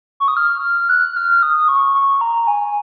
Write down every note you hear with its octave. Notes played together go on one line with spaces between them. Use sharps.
C#6
D#6
F6
F#6
F6
D#6
C#6
C#6
A#5
G#5